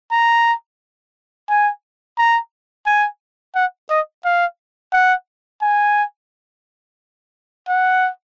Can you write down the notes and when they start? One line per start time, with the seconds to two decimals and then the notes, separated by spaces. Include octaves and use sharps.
0.11 A#5
1.49 G#5
2.18 A#5
2.86 G#5
3.55 F#5
3.90 D#5
4.24 F5
4.93 F#5
5.62 G#5
7.68 F#5